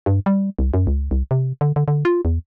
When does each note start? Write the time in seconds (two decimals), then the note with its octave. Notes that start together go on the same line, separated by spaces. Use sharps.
0.06 G2
0.26 G3
0.59 C2
0.74 F#2
0.87 C#2
1.11 C2
1.31 C3
1.61 D3
1.76 D3
1.88 D3
2.05 F4
2.25 E2